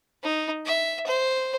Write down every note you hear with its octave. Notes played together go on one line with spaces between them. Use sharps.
D#4
E5
C5